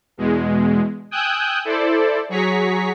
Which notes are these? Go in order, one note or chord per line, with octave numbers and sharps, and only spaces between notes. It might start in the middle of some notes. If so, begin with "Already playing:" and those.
E2 B2 G#3
G5 G#5 D#6 E6 F#6 G6
E4 A4 C5 D5
F#3 G#4 A#5 C#6 B6